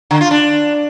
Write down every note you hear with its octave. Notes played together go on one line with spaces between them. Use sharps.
D3
F4
D4